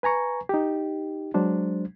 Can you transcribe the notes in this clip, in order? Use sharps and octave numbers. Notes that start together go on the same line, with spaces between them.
B4 G#5 A#5 C#6
D#4 G4
F#3 G#3 D4 C5